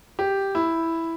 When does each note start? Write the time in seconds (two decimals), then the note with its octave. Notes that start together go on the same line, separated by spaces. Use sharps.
0.19 G4
0.55 E4